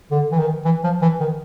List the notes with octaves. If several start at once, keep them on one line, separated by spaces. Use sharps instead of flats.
D3
E3
D#3
E3
F3
E3
D#3